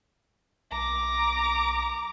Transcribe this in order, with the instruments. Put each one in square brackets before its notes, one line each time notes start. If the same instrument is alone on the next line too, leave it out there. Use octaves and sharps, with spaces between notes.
[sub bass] B1 [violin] A#5 D6